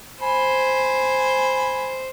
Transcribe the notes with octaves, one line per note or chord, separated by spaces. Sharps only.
C5 G#5 B5